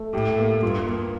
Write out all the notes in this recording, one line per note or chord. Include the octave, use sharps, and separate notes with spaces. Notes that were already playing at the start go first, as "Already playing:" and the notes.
Already playing: A3
A2 G4
A#3
G2 F4
A#3